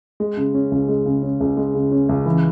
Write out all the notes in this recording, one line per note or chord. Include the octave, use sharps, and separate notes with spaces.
G#3
C#3
C#4
C#2
G#3
C#3
C#4
C#2
G#3
C#3
C#4
C#2
E3